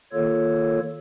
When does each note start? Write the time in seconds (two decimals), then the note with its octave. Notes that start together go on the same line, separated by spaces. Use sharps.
0.12 D#3 A#3 F4 A4 C#5